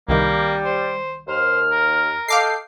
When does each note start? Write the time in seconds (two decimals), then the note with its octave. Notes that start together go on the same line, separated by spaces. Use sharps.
0.09 C2 D#3 G3 A#3
0.65 C5
1.28 D#2 C5 F6
1.71 A#4
2.28 A4 D#5 F5 G5 D6 C7